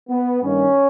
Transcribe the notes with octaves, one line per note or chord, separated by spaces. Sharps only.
B3
G2 D#3 G3 A#3 C#4